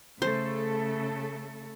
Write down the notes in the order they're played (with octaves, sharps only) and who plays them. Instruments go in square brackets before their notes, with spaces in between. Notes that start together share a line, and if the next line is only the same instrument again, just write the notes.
[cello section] C#3 A3 A4 [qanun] C5